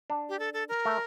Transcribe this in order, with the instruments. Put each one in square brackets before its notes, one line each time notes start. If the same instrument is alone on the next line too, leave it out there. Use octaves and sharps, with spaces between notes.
[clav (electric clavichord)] D4
[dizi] G4
A4
A4
A#4
[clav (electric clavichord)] A3